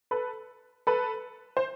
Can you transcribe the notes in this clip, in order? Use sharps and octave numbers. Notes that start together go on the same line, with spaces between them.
A4 B4
A4 B4
C5